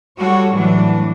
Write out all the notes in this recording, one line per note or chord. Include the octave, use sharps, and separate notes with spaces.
G3 F#4 A4 C#5
A2 E3 F#3 D4